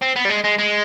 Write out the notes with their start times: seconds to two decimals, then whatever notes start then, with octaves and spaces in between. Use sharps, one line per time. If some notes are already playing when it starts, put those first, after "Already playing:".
0.02 C4
0.16 B3
0.25 G3
0.29 G#3
0.44 G#3
0.58 G#3